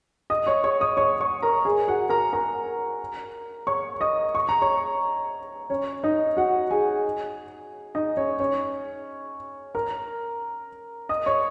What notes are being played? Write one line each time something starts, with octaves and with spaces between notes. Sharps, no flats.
D#5 D#6
C#5 C#6
C#5 C#6
D#5 D#6
C#5 C#6
C#5 C#6
A#4 A#5
G#4 G#5
F#4 F#5
A#4 A#5
A#4 A#5
C#5 C#6
D#5 D#6
C#6
A#5
C#5 C#6
C#4 C#5
D#4 D#5
F#4 F#5
G#4 G#5
D#4 D#5
C#4 C#5
C#4 C#5
A#4 A#5
D#5 D#6
C#5 C#6